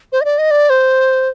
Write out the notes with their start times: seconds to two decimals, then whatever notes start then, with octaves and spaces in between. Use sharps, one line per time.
0.12 C5
0.21 D#5
0.25 D5
0.38 D#5
0.51 D5
0.70 C5